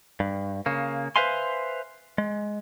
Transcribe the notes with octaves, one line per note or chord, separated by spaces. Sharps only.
G2
C#3 A#3
B4 C5 E5 F5 G#5 C6
G#3